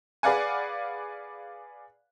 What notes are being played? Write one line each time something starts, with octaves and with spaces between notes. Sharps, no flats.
G#4 B4 D5 F5 F#5 G#5